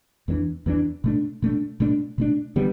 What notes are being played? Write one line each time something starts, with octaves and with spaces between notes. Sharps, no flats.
E2 E3 G3 D4
E2 E3 G3 D4
B2 A3 D4
B2 A3 D4
B2 A3 D4
B2 A3 D4
D3 G3 B3